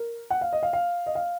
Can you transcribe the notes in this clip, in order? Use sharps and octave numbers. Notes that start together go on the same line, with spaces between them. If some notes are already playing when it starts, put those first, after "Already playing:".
Already playing: A#4
F#5
F5
D#5
F5
F5
D#5
F5